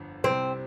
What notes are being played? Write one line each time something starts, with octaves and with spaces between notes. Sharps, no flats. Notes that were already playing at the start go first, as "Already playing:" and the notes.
Already playing: G1 F2 D3
C2 C3 G3 C4